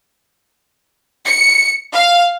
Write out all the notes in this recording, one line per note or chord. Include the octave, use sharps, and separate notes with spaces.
C#7
F5